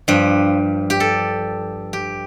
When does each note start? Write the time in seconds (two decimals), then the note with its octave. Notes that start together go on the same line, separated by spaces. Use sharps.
0.08 G2 F3 G4
0.90 G4
1.00 A4
1.93 G4